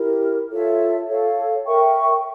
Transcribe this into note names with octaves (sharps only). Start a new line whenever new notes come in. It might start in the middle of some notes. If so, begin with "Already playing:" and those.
Already playing: E4 G4 A#4
F4 A4 C#5 E5
A4 C#5 F5
A#4 E5 G5 C#6